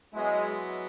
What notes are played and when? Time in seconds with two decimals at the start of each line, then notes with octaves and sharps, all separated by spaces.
0.14 F#3 G#3 B3 E4